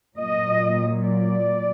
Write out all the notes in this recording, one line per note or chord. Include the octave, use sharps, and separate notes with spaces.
A#2 F#3 D#5
D5